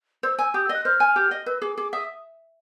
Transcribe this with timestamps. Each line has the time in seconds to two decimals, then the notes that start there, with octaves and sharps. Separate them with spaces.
0.23 C5 E6
0.39 G#5 E6
0.54 G4 D#6
0.65 E6
0.69 D#5 F#6
0.85 C5 F6
1.00 G#5
1.16 G4
1.31 D#5
1.46 B4 E6
1.62 G#4 D6
1.77 G#4 D6
1.93 E5 D#6